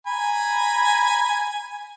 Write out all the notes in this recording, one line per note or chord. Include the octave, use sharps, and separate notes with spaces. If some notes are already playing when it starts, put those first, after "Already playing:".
G#5 A#5 B5